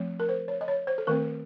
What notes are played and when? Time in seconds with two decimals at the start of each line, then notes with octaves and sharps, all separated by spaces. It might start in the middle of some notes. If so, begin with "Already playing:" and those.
Already playing: F3 A3 C4
0.20 A#4
0.29 C5
0.48 C#5
0.61 D#5
0.68 C#5
0.87 C5
0.98 A4
1.07 D#3 A3 C4 A#4